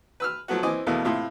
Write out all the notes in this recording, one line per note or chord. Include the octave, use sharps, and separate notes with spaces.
B4 E6 F6
F3 F#3 A3 B3 F#4
E3 C4 D#5 G#5 D6
E2 B2 E3 A3 A#3
A2 C3 F4